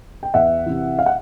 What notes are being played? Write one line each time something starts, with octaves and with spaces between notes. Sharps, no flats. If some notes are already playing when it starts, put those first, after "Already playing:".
G5
E2 E5 F#5
C3 E3
F5
F#5